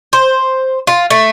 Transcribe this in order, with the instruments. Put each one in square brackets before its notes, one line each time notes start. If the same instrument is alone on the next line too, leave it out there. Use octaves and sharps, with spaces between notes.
[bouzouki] C5
F4
A3